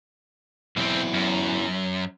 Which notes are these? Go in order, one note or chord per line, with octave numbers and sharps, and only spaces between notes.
B2 F#3 B3 C4 E4
F#2